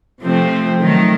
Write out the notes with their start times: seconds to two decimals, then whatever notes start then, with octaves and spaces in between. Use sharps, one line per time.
0.22 C3 F3 A3 C4
0.80 D#3 F#3 A3